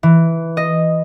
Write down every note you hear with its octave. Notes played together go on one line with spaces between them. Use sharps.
E3
D#5